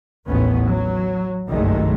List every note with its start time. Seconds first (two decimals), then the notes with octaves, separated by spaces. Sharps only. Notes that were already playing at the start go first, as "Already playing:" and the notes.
0.26 A1 D#2 B3 C#4
0.68 F#3
1.48 F#1 B1 G2 D#3 G#3 A3